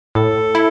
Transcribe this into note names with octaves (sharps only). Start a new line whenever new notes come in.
A2 A4
E4